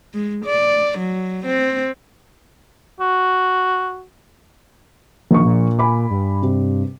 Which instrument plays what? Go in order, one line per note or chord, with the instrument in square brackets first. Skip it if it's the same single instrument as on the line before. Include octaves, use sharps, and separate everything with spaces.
[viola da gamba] G#3
D5
F#3
C4
[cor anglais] F#4
[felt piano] A#1 C#6 [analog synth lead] D#3
[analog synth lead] A#2
[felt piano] G#5 B5 D6
[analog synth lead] G2
[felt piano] C3